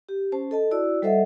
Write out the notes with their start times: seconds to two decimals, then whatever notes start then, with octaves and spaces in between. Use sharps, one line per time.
0.09 G4
0.32 C#4 C5 A5
0.51 A4 D#5 A5
0.71 E4 F#4 D5 E6
1.02 G3 A4 C5 D#5 E5 F#5